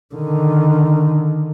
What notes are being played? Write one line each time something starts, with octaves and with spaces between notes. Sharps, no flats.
D3 D#3